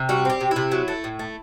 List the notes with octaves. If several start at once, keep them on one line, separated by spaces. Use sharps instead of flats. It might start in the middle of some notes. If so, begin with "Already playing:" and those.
Already playing: C3
G3 F#4
C4 G4
C3
C3 E4
F#3
A3
A2
A3